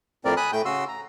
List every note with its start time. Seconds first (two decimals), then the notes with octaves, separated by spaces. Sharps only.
0.25 F2 A2 C4 A#4 D5
0.37 G#5 B5 D#6 F#6
0.53 A2 A3 G5 G6
0.65 C#3 F#4 C6 E6
0.88 A#5